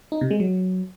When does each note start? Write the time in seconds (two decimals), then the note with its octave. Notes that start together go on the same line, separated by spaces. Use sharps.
0.12 D#4
0.21 C3
0.31 G#3
0.40 F#3